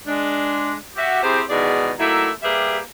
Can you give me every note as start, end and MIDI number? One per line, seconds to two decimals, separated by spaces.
0.07 0.73 56
0.07 0.73 62
0.96 1.21 66
0.96 1.21 67
0.96 1.21 76
1.22 1.41 48
1.22 1.41 60
1.22 1.41 64
1.22 1.41 67
1.22 1.41 68
1.22 1.41 72
1.50 1.91 40
1.50 1.91 44
1.50 1.91 47
1.50 1.91 51
1.50 1.91 68
1.50 1.91 74
1.99 2.29 54
1.99 2.29 57
1.99 2.29 58
1.99 2.29 63
1.99 2.29 64
2.43 2.78 55
2.43 2.78 58
2.43 2.78 67
2.43 2.78 68
2.43 2.78 71
2.43 2.78 76